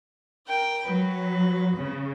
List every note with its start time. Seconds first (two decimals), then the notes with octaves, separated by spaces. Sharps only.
0.47 A#4 G5
0.86 F#3 B4
1.78 C#3